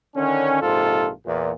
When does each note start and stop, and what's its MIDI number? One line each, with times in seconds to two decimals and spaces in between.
0.17 0.60 50
0.17 0.60 51
0.17 0.60 61
0.61 1.10 34
0.61 1.10 44
0.61 1.10 48
0.61 1.10 65
0.61 1.10 69
1.26 1.52 40
1.26 1.52 46